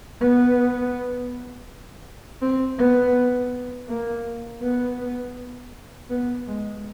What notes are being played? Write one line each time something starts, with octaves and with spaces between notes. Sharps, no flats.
B3
C4
B3
A#3
B3
B3
G#3